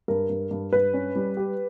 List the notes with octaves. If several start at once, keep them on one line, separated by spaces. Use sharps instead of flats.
G2 A#4
G2
G2
G2 B4
C#4
G3
G4